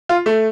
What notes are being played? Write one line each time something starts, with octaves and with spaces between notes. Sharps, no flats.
F4
A3